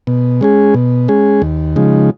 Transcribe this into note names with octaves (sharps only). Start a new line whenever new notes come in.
B2
G#3 C#4 G#4
B2
G#3 C#4 G#4
D#2
C#3 F3 G#3 D#4